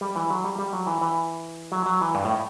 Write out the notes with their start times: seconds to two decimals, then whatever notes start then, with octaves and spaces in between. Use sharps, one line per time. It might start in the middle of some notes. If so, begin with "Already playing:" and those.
0.01 G3
0.16 E3
0.30 F#3
0.44 G3
0.59 G3
0.73 F#3
0.87 E3
1.01 E3
1.72 F#3
1.86 F#3
2.01 E3
2.15 G2
2.25 A2